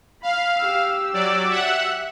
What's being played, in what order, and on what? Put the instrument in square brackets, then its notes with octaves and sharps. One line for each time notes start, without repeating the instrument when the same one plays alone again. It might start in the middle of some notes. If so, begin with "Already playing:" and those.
[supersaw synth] F5 [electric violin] B5
[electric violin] G4 E6
[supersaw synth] F#3 D5
E5 F#5